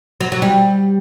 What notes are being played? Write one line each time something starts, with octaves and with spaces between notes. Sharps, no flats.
F#3
F#3
G3